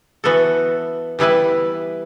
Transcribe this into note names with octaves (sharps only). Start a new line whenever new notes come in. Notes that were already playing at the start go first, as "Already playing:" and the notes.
E3 B3 F#4 A4
E3 G3 B3 E4 B4